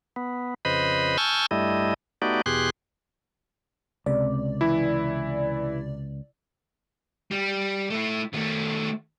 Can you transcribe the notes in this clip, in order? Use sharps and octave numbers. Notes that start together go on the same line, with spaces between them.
B3
F2 C#3 B4 C5 D#5 B5
G#5 A5 C#6 E6 F6 G6
G2 G3 A3 E4 D#5
A3 B3 D#4 F#4 G4 D5
E2 B2 G4 G#4 C6 F#6
C#2 C3 D5
E3 E4
G3
A3 E4
D#3 A3